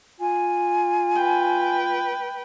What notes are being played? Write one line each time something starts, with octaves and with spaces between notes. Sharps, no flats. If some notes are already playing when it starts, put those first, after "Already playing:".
F4 G#5
B4 G5